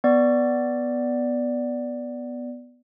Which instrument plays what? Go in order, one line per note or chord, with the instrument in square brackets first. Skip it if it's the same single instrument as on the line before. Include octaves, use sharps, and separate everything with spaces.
[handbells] B3 D5